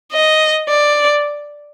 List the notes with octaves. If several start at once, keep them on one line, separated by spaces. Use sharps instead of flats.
D#5
D5